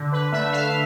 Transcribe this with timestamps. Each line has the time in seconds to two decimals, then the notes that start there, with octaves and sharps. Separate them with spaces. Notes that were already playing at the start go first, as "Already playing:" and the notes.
Already playing: D3
0.12 B4
0.32 A3 E5
0.52 F5